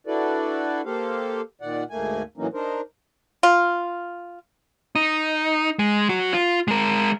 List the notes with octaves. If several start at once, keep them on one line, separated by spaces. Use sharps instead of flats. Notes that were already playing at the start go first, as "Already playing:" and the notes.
D4 E4 F#4 A4 B4 D5
A#3 G4 A4 C5 F5
A#2 D#3 D5 F#5
D2 G#2 A3 A#3 G#5
A2 E3 F#3 A#3 C#4 D#4
D4 D#4 A#4 C5
F4
D#4
G#3
F#3 F#4
F4
G#3 A#4